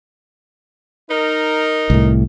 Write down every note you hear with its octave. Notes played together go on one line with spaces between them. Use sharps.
D#4 A#4
C2 A2